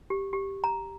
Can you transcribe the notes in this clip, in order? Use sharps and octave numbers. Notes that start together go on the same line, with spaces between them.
G4
G4
A#5